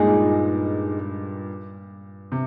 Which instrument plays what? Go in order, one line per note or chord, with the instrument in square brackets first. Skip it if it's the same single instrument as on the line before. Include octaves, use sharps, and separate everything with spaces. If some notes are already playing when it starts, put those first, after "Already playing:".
Already playing: [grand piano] G2 A#2 [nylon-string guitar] G#3 D#4 G#4
[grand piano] C3